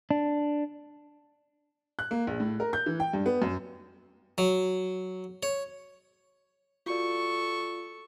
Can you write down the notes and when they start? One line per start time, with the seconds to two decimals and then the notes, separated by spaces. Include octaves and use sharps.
0.11 D4
1.99 F#6
2.11 A#3
2.27 A#1
2.40 A2
2.60 A#4
2.73 G6
2.86 E3
3.00 G5
3.13 G2
3.26 B3
3.42 F#2
4.38 F#3
5.43 C#5
6.86 F4 F#4 A4 D5 C#6